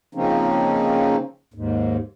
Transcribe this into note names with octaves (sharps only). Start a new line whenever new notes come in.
C#3 F3 A#3 C4 C#4 D#4
D#2 G#2